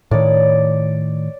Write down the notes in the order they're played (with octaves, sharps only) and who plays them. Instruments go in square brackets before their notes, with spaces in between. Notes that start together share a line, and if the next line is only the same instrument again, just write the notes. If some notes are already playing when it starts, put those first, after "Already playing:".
[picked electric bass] A2 D#3 [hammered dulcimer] C#5 D5